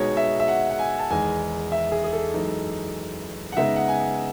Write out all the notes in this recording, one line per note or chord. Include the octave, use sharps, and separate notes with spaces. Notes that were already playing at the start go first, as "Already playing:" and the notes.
Already playing: B2 G#3 D#4 C#5
E5
E5
F#5
F#5
G#5
A5
E2 D#3 G#3 D#4 G#5
E5
G#4
G#4
A4
F#2 E3 G#3 D#4
F#5
C#3 G#3 B3 D#4 E5
F#5
G#5